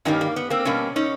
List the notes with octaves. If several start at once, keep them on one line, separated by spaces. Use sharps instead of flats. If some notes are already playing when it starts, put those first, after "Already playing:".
G2 D#3 G3 A#3 C#4 D#4
A#3
B3
A#3 C4
B2 G3 A#3 C#4
C#4 D#4